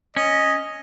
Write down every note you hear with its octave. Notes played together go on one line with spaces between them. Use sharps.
C#4 D#5